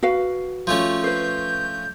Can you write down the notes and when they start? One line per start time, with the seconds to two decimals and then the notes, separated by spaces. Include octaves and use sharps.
0.03 F#4 B4 F5
0.67 F3 A3 C#4
1.04 B4 C5 G6